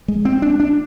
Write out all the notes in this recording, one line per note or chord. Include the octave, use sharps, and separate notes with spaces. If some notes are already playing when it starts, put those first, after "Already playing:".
G#3
C4
D4
D4